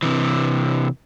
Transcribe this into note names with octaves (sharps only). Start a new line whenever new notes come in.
C3 E3